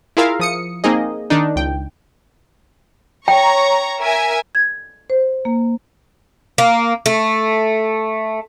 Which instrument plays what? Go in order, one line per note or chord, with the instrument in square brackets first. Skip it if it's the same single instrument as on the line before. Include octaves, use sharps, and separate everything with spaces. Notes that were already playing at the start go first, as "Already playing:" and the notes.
[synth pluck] E4 F4 G#4 A#4 E5 F5
F3 D#6 C#7
A#3 C4 D#4 G#4 D#5
D#3 D4 D#4
C#2 G5
[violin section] C#5 A#5 C#6 [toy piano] G5
[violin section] A#4 E5 G#5
[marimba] G#6
C5
A#3
[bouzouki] A#3
A3